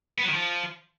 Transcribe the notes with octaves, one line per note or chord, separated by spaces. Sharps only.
B3
F#3
D#3
F3